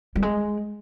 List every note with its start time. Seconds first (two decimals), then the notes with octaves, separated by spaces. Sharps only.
0.16 G3
0.22 G#3